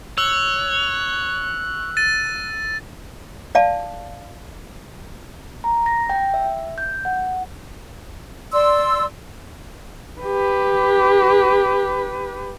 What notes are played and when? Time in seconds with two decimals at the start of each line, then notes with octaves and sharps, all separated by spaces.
0.18 C#5 E6 F#6 F#7
1.97 A6 D#7
3.55 D5 F5 A5
5.64 A#5
5.86 A#6
6.10 G5
6.34 E5
6.78 G6
7.05 F#5
8.52 D5 C6 E6
10.22 G4 B4